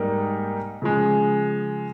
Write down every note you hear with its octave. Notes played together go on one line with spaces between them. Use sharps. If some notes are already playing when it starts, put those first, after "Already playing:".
Already playing: G#2 G3 A#3 D#4 A#4
C#3 F3 G#3